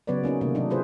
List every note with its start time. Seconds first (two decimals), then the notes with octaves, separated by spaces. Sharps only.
0.07 C#3 F#3 B3 B4 C#5 D5
0.24 A#3 C#4 D#4 F#4
0.41 C3 D#3 A3 A#3
0.55 F#3 D4 D#4
0.70 A#3 F4 G#4 B4 C5